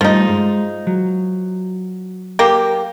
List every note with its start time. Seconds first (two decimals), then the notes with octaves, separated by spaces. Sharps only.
0.01 G2 F3 G3 A3 D#4
0.28 G#3
0.87 F#3
2.39 A#3 G4